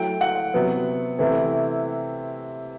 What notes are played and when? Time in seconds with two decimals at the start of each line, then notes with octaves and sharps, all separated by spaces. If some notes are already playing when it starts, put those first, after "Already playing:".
Already playing: F#3 A3 E4 G5
0.21 F#5
0.54 C3 F#3 B3
1.19 C3 E3 A3 E4